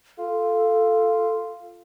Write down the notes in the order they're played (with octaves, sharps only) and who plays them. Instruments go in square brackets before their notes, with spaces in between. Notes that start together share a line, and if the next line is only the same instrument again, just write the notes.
[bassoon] F4 [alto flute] A4